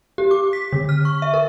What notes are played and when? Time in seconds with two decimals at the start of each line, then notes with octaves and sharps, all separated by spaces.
0.18 G4
0.31 D6
0.53 B6
0.73 D3
0.89 F6
1.05 C#6
1.22 E5
1.34 A#4